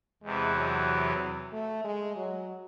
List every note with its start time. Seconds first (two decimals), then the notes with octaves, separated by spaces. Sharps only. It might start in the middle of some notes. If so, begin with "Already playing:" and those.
0.23 E2 C3 E3 G#3
0.55 F#3
1.52 A3
1.84 G#3
2.16 F#3